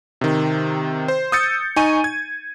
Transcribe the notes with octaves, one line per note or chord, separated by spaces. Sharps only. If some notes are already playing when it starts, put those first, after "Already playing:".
C3 D#3
C5
D#6 E6 G6 A6 C#7
D#4 G#5 C#6 D#7
G#6